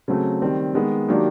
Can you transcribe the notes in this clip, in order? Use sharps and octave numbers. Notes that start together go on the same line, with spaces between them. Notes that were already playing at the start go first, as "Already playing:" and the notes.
C#3 F#3 A3 C4
D#3 G3 C4
D#3 G#3 B3
D#3 F#3 A#3 D4 G4